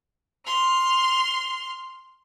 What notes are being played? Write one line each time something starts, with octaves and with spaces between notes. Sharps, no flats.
C6 F6